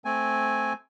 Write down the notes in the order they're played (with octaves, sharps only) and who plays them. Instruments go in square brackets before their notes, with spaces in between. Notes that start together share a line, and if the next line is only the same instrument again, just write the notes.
[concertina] A3 C4 G#5